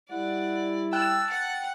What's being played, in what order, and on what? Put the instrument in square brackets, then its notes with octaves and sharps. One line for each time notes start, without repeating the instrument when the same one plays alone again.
[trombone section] G3 E4 [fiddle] D5 [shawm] F#5
[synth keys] G5 F#6 [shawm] A5 [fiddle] E6
[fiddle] F#5